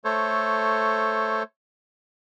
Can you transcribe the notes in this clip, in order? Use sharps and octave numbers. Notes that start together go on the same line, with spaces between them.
A3 A4 C5 C#5